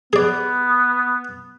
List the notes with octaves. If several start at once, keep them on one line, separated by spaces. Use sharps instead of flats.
B3 G#4 D5